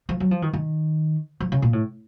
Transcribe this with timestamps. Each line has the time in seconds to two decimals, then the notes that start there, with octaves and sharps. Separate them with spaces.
0.09 F3
0.20 F#3
0.31 F3
0.42 D#3
0.53 D#3
1.40 F3
1.52 C#3
1.62 A#2
1.73 A2